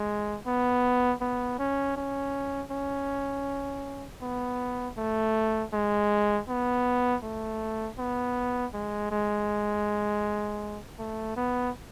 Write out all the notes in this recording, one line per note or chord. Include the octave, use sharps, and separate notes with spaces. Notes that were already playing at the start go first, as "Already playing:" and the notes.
Already playing: G#3
B3
B3
C#4
C#4
C#4
B3
A3
G#3
B3
A3
B3
G#3
G#3
A3
B3